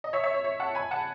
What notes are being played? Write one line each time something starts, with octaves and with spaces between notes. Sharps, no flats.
D#5
C#5 E5
C#5 E5
C#5
C#5
F#5 A5
G#5 B5
F#5 A5